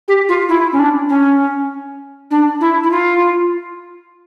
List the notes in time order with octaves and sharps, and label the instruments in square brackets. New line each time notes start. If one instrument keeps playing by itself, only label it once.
[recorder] G4
F4
E4
C#4
D4
C#4
D4
E4
E4
F4